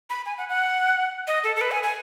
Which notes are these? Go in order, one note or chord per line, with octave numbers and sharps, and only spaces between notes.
B5
G#5
F#5
F#5
D#5
A4
A4
B4
G#5
G#5